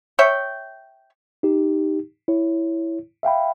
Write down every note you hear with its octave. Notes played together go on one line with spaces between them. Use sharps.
C#5 E5 G5
D#4 G4
E4 C#5
E5 F5 G5 B5